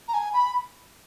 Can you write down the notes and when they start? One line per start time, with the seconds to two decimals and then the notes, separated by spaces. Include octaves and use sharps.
0.08 A#5
0.14 G#5
0.33 B5